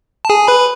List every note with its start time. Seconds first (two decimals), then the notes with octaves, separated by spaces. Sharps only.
0.25 A5
0.30 G#4 G#5
0.48 B4 B5